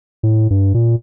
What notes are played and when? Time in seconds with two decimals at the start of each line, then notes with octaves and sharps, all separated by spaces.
0.23 A2
0.50 G2
0.74 A#2